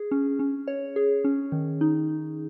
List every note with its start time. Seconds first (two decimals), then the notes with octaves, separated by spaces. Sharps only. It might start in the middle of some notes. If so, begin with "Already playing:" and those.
Already playing: G#4
0.11 C#4
0.39 C#4
0.68 C#5
0.96 G#4
1.24 C#4
1.52 D#3
1.81 D#4